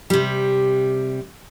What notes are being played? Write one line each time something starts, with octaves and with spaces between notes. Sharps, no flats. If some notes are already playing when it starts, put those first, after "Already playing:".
C3 G3